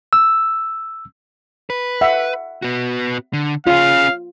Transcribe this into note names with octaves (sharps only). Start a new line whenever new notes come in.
E6
B4
E5 F#5
B3 F#4
D3
C#4 F4 G#4 F5